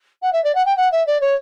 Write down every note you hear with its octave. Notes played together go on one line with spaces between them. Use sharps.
F#5
E5
D5
F#5
G5
F#5
E5
D5
C#5